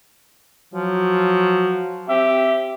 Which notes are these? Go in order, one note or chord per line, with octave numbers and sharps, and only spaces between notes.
F3 F#3
C4 G4 E5